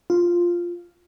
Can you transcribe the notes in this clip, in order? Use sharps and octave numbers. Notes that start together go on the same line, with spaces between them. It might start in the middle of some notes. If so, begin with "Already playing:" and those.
F4